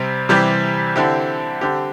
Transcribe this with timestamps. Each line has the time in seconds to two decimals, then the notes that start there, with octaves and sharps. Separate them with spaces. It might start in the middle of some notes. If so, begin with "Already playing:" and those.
Already playing: C3 G3 C4
0.29 C3 E3 G3 C4 G4
0.96 D3 C4 E4 G4
1.61 D3 C4 G4